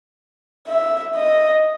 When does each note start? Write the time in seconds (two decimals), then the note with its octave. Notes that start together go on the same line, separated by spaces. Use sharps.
0.68 E5
1.15 D#5